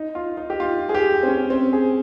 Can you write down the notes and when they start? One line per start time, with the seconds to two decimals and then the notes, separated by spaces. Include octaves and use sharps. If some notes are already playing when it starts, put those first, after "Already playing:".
Already playing: D#4
0.15 F4
0.37 D#4
0.50 G4
0.60 F4
0.89 G#4
0.94 G4
1.23 C4
1.28 C#4
1.50 C4
1.73 G#4